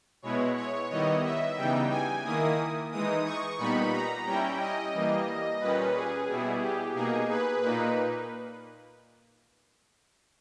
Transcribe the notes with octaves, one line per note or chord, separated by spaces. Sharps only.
B2 G#3 B3 E4 C#5
C#5
D#3 G3 B3 E4 D#5
E5
C#3 E3 G3 B3 D#4 G5
G#5
D#3 A#3 E4 D#6
E3 G#3 D#4 D#6
C#6
A#2 G3 B3 D#4 B5
A#5
G3 C#4 E4 G5
D#5
E3 G3 A#3
A#2 G3 C#4 B4
G#4
B2 G3 B3 E4
G4
B2 A#3 D#4 G#4
B4
A#2 A#3 D#4 B4